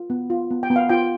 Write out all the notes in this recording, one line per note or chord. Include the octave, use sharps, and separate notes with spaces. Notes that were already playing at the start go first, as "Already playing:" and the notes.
Already playing: F4
B3
F4
B3
G5
B3
F5
F4 G5